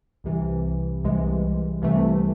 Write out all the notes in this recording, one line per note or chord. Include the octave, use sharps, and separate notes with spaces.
C2 C3 E3
C2 C3 E3 G#3
C2 C3 E3 A3